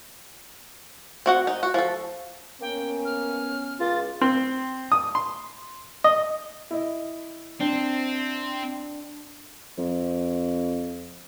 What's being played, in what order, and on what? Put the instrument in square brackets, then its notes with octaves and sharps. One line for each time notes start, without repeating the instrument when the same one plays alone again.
[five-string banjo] C4 F#4 F#5
D#4
F#4
F3 A4
[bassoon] A#3 [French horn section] B3 C#4 [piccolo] G5
[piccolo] F6
[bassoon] C#2 [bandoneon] F4 [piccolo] A6
[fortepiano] C4
D#6
C6
D#5
[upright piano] E4 D#5
[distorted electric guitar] C4 [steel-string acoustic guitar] D4
[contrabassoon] F2